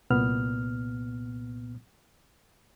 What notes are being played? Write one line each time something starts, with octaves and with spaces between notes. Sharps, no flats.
C2 A#2 B3 F6